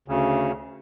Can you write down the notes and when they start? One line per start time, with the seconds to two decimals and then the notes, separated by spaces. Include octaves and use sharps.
0.08 D2 C#3